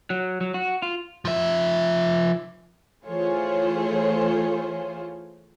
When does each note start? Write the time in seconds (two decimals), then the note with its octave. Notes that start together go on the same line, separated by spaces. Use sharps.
0.10 F#3
0.41 F#3
0.54 F#4
0.82 F4
1.25 F3 E5
3.04 E3 A3 F4 G#4 C5 C#5